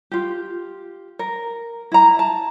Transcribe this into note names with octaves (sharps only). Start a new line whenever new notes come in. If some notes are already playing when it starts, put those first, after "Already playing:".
F4 G4
A#4
E4 A#5
A5